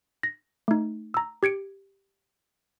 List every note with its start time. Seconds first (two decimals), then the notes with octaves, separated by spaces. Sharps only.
0.23 A#6
0.68 A3 D#4
1.14 A#5 E6
1.43 G4 G#6 C#7 D7